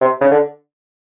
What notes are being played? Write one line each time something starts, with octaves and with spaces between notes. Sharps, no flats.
C3
C#3
D3